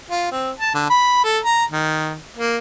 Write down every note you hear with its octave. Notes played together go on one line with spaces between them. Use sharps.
F4
C4
A5
D3
B5
A4
A#5
D#3
A#3